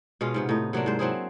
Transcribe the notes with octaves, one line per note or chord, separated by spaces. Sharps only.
B2 G#3 C#4 F4
G#2 C3 B3
A2 D#4
C3 F#3 A#3 D4
G#2 C5
F#3 C4 E4 G#4